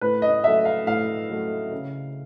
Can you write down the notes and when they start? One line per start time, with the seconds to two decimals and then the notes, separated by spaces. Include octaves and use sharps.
0.01 A2 B4
0.22 D#5
0.44 F#3 A3 E5
0.65 F5
0.86 A2 F5
1.29 F#3 A3
1.71 C#3